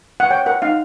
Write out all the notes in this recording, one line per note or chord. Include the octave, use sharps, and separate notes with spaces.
F#5
C#5 G5
A#4 F#5
D#4 F5